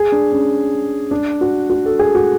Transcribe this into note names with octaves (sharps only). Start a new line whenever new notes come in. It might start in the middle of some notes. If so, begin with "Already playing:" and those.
Already playing: G#4
D4
C#4
D4
F#4
F#4
A4
G#4
F#4